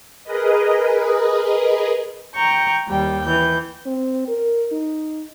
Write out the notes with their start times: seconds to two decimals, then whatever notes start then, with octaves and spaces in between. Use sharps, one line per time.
0.24 G#4 A#4 B4 D#5
2.34 G5 A#5 C#6 G6
2.89 D#2 G3 G5
3.23 E3 G6
3.85 C4
4.28 A#4
4.72 D#4